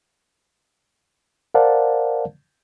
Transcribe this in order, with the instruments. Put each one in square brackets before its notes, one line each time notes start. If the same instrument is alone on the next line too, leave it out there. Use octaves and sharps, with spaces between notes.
[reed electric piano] A#4 C5 D5 F5 F#5 A5